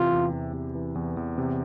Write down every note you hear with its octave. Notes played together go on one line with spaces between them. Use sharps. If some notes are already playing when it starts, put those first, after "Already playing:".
Already playing: C3 E3 F4
E2
E2
C3
E3
E2
E2
C3